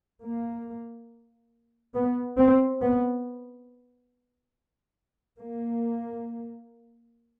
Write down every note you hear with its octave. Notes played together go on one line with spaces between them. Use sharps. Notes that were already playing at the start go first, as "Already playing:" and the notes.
A#3
B3
C4
B3
A#3